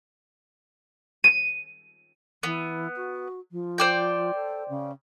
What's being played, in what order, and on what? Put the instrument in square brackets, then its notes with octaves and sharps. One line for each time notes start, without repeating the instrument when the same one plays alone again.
[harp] D#7
[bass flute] E3 [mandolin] B3
[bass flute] F#4
F3
[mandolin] C5 D5 G5
[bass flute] A4
C#3